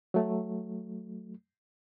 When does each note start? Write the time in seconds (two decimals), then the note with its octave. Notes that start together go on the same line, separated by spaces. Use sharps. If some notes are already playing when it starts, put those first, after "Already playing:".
0.14 F#3 A3